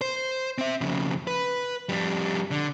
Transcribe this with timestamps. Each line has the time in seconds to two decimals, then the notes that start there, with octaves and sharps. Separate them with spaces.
0.01 C5
0.58 C4 E5
0.81 F2 C#3
1.27 B4
1.89 F2 G3
2.51 D3